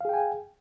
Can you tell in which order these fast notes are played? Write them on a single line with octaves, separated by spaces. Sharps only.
F5 G#4 G5 G#5